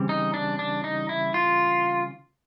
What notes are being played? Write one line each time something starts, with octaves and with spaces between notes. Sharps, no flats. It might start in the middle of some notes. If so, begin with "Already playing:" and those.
Already playing: C#3 E3 G3 C4
D#4
D4
D4
D#4
E4
F4